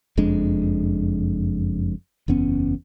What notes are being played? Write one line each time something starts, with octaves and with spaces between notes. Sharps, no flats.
F#1 F2 G#3 D4
F#1 E2 B3 C#4